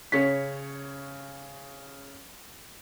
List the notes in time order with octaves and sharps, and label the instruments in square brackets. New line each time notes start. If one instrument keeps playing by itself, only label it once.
[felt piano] C#3 C#5 B6